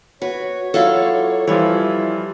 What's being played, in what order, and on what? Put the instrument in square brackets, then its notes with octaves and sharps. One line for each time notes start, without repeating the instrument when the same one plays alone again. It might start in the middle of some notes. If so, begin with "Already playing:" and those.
[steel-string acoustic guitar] F#4 [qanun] B4 [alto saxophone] C#5
[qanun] F#3 E4 F4 [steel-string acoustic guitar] A4 D5 F5
[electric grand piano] E3 G3 F4 [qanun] F3 C#5 [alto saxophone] E4